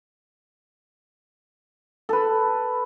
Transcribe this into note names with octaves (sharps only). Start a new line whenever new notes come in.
A4 B4